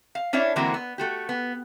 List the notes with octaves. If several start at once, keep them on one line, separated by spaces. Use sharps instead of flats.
F5
C#4 D4 E4 C#5 E5
D3 E3 G#3 A#3 C4 F#4
B3
A3 F#4 G4
B3